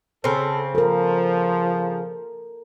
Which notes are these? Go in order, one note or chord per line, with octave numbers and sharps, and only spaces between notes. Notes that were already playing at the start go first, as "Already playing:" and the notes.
C#3 C4 A4
F3 A4 A#4